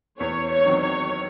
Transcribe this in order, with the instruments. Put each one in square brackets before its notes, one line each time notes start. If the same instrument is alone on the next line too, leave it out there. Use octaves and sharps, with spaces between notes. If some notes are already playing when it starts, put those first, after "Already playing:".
[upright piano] E2 [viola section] C#5
[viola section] C#5
[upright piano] D#3 F#3 C4
[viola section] C#5